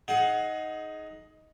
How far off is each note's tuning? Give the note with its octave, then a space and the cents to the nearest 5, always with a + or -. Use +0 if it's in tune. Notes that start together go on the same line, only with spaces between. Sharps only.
D#4 +10 G#4 +30 F#5 +0